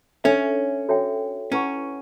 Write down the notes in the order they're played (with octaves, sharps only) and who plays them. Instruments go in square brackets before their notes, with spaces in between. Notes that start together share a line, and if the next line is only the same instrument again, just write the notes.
[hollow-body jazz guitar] C#4 [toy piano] D4 A4 C#5 E5
[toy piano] F#4 A4 C#5 E5 G5
[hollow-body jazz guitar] C#4 [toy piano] E4 B4 F#5 C#6